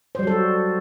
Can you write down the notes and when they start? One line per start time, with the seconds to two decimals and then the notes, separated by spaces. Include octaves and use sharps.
0.15 C5
0.19 G3
0.23 F#3
0.27 A4
0.31 F#4